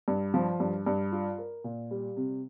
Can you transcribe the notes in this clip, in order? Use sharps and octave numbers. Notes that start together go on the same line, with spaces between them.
G2
F3
G2
G2
F4
A#4
A#2
G3
C3